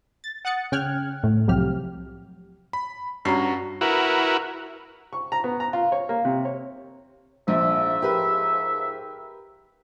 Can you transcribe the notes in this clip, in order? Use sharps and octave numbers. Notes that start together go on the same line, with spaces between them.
A6
F#5 D#6 F#6 A6 C#7
C#3 C#4 G5 F6 F#6 G#6
A2
C2 C3 F3 F#3 G4 F6
B5
G2 C#4 F#4 A#5 C7
E4 F#4 A#4 B4
C#6
A#5
B3
A#5
F4
C#5
A#3
C3
C#5
A#1 G#2 F3 E5
G4 A#4 B4